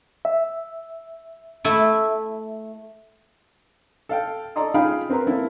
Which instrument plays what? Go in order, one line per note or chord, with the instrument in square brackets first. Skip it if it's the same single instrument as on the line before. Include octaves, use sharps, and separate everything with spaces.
[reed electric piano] E5
[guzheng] A3 E4
[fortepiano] A4 F5 G5
A4 D5 D#5 A#5 C6 D#6
D#4 F4 G#4 F5 G5 B5
C4 A#4 B4 A#5 C6
A#3 C4 E4 A4